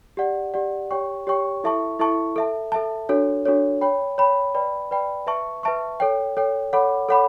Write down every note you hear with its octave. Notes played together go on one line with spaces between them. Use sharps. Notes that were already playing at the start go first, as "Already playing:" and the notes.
G4 D5 F#5
G4 D5 F#5
G4 C#5 G5 C#6
G4 C#5 G5 C#6
E4 A4 E5 A5 C#6
E4 A4 E5 A5 C#6
A4 E5 A5
A4 E5 A5
D4 F#4 A4 C#5
D4 F#4 A4 C#5
C#5 G5 B5
C#5 G5 B5
B4 D5 G5 B5
B4 D5 G5 B5
B4 E5 A5 C#6
B4 E5 A5 C#6
A4 C#5 G5
A4 C#5 G5
A4 C#5 F#5 B5 D6
A4 C#5 F#5 B5 D6